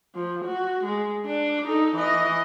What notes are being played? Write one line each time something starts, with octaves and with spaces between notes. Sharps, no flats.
F3
F#4
G#3
D4
D#4 A4
E3 D#5